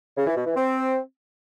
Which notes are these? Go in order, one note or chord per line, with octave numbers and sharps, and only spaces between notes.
C#3
E3
B2
E3
C4